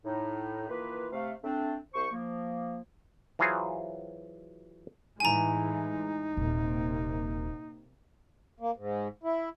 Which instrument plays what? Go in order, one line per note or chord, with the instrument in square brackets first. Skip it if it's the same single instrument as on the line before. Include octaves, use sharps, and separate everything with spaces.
[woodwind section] A2 D#4
D#3 E3 A#3 F4 B4
C3 A3 F5
A3 C4 D4
C2 C5 C#6
F3 A#3
[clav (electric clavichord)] E3 F#3 F4 F#4 G#4 C5
[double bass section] A2 E3 G#3 [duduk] D#4 [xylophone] G#5 A#5
[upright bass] D#1 [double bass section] C3 A#3
[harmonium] A#3
G#2
E4